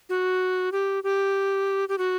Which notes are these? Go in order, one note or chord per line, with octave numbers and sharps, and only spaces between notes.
F#4
G4
G4
G4
F#4